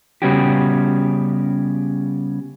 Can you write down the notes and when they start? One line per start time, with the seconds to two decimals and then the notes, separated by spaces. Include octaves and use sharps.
0.22 C#3 G3 B3 C#4 F#4 G4